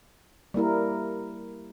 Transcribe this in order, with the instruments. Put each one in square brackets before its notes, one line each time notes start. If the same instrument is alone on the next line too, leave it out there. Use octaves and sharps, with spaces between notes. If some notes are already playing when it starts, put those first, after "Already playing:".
[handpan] G3 A#3 E4 A#4